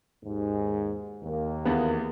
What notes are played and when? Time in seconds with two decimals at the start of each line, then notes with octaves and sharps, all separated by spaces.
0.23 D#2 G#2
1.23 D#2 A#3
1.65 E2 B3